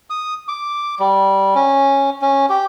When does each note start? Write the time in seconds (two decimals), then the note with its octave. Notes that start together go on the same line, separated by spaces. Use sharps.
0.10 D#6
0.48 D6
1.00 G3
1.55 C#4
2.22 C#4
2.49 G4